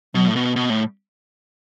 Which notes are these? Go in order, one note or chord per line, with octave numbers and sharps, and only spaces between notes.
B2 F#3
A2
B2
B2
A2